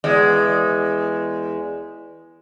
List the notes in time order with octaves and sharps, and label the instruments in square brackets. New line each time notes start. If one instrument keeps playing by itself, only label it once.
[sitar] E2 G#3